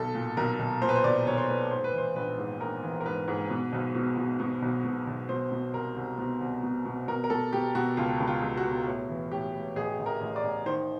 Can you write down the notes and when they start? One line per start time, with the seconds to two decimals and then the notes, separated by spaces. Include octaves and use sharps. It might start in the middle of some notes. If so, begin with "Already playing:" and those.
Already playing: B1 A4
0.15 A#2
0.37 B1 A#4
0.59 B1
0.82 A#2 C5
0.89 B4
0.96 C5
1.04 B1 D5
1.26 B1 C#5
1.37 C5
1.49 A#2 B4
1.71 G#2 C5
1.84 B4
1.93 E3 C5
2.16 A#1 B4
2.38 G#2
2.60 A#1 A#4
2.83 E3
3.00 A#4
3.06 G#2 B4
3.28 G#2
3.50 B2
3.73 B1
3.95 B2
4.17 B2
4.40 B2
4.62 B1
4.85 B2
5.07 B1
5.29 B2 C5
5.52 B2
5.73 C2 A#4
5.96 C2
6.18 B2
6.41 C2
6.63 B2
6.85 B2
7.08 B2 A#4
7.24 A#4
7.30 B2 A4
7.53 B2 G4
7.75 B2 F#4
7.97 C#2 F4
8.20 C#2
8.28 F4
8.42 C#2
8.57 F#4
8.65 B2
8.87 A2
9.09 E3
9.31 A2 G4
9.54 A2
9.76 A1 G#4
9.99 A1
10.06 A#4
10.21 A1
10.36 D5
10.43 A1
10.66 D#3 C5